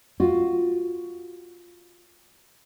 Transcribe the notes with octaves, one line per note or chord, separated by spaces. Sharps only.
F4 F#4